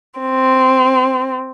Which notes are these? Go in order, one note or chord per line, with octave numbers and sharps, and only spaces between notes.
C4